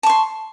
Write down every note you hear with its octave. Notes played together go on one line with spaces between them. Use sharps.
A5 C6 C#6